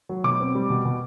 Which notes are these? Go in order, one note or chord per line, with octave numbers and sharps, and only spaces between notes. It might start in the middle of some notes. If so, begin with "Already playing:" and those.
F#3
B2 D6
C4
G3
B2
B2